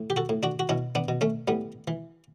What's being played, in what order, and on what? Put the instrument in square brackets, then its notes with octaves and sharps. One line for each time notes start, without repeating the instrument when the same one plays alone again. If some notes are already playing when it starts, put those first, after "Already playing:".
Already playing: [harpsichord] A2
G4
F#4 A4
A2
D4 F#4
F#4
B2 C#4 E4
B3 D4
B2
A3 C#4
A2 G3 B3
E3